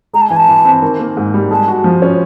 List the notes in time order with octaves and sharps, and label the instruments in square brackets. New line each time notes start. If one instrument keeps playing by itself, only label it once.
[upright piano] G#3 [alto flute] A#5
[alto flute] A5
[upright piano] E3 [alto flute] G#5
[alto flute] A5
[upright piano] E3
C4
D#3
A#3
G#2
G3
[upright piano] G#3 [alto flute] A5
[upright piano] F#4
F3
C#4